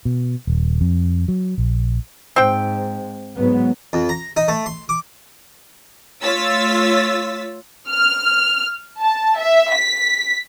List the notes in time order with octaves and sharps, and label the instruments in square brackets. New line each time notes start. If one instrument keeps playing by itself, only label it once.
[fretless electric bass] B2
D#1
F2
F#3
A#1
[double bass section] G#2 [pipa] C4 G5
[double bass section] G#2 F#3 B3
[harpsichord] F2
A#5
D#4
A3
C6
D6
[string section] A3 F4 C#5 E6 A6 B6
[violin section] F6
A5
E5
B6